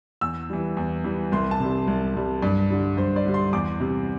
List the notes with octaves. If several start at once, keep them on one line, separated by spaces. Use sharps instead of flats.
E2 E6
E3 G3
E2
E3 G3
C2 C6
A5
C3 G3
C2
C3 G3
G2 D5
D3 G3
G2 C5
D5
D3 G3
C6
E2 D6
C3 G3